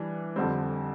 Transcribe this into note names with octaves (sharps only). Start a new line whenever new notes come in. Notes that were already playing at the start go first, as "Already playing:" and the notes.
Already playing: E3 G3 D4
F2 D3 G3 C4